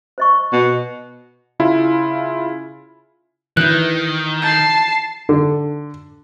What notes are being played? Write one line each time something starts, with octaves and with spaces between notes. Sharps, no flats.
C5 D#5 C#6
B2
C#3 E4 F4
D#3 E3 E4 F#6 G6
A5 G6 C7
D3